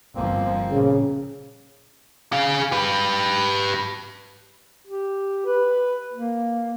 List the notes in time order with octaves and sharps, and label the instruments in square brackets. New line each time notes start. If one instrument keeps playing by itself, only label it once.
[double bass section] G1 F3 [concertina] A#3 C4
[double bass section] A#2 [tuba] C#3
[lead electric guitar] G#4 F5
G4 B4
[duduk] G4
B4
A#3